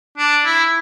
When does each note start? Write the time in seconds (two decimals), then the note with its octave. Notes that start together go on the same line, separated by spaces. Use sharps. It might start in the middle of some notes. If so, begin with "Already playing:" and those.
0.18 D4
0.45 E4